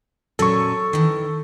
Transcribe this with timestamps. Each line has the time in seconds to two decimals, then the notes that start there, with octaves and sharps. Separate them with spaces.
0.39 A#2 F#3 C#4 A4 C#6
0.93 D#3 E3